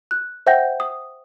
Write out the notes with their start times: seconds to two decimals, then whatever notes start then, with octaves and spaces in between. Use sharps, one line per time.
0.11 F#6
0.47 C5 E5 F#5 G5 G6 A#6
0.80 D#6